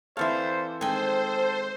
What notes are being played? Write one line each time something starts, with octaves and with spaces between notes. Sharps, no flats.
E3 C4 E4 A4 C5 D5 F5
D#3 G#3 C4 A4 C5 G5 G#5